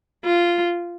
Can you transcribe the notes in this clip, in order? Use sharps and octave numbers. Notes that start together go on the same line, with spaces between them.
F4